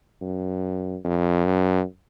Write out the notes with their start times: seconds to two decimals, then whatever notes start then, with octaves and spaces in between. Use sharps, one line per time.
0.21 F#2
1.04 F2
1.45 F#2